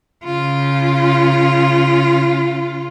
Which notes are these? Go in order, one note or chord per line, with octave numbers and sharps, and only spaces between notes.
C#3 F4